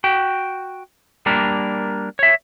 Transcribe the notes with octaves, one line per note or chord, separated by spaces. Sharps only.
F#4 G5
G3 A#3 D4 A#4
C#5 E5